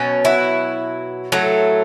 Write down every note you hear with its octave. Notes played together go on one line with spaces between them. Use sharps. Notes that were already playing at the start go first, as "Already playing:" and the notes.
Already playing: B2 F#3 C#4
E4 F#4
A2 F#3 A3